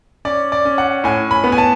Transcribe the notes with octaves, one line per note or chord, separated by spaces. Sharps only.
C#4 D5
D5
C#4
F#5
A2 G#5
B5
B3
G#5
A5